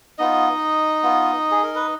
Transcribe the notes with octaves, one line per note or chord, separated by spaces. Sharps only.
B3 D#4 F4 D#5
B3 F4
G#4
A#4
B4